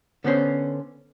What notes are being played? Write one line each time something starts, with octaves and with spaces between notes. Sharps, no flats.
D3 B3 C#4 C5